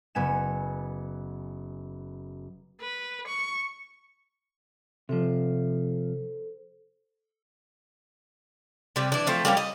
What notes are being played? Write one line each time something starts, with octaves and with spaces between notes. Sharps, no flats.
F#1 B3 G#5 E7
B4
C#6
C3 F3 A4 C5
C3 G3
E3 D4
F3 A3 C4
G3 A#3 C#4 G4
D#5